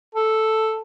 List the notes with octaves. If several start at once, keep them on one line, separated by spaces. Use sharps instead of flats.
A4